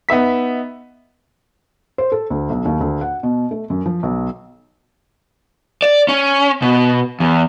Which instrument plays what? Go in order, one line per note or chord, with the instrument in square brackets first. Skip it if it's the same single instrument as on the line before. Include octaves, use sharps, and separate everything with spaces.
[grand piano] B3 D#4 E5 B6
[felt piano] C5
A4
D2
B1
D#2
D2
F#5
B2
A3
F#2
F3
B1
[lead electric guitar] D5
C#4
B2
E2